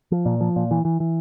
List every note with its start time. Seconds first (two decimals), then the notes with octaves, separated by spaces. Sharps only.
0.12 F3
0.25 A#2
0.41 F3
0.56 A#2
0.71 E3
0.85 E3
1.00 E3